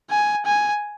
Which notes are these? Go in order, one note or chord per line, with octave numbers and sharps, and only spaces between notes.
G#5
G#5